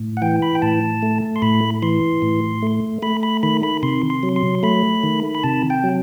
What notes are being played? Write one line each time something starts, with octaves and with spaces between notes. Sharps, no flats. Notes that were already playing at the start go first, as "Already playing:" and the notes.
Already playing: A2
F#5
E3 G5
B5
G5
A2 A5
A3
C6
A2 B5
E3 C6
A2
A3
A3 B5
B5
D#3 B5
B5
C3 C6
C6
F#3
C6
A3 B5
D#3
B5
C3 A5
G5
F#3